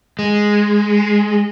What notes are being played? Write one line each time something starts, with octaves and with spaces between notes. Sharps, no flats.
G#3